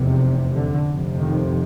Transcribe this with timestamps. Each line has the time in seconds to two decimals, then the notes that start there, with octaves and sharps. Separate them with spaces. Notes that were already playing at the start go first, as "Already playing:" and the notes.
Already playing: F1 E2 C3
0.55 D3
0.86 F1 F2 C3
1.20 D#3